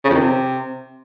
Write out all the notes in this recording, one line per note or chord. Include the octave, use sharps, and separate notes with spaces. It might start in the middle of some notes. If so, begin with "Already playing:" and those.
C#3
F2
D#3
C3